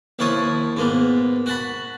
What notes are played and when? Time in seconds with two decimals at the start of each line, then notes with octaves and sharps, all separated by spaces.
0.19 D#2 F3 E4 C#5 A5 D#6
0.77 G#2 A#3 B3
1.46 F#4 F#5 A5 B5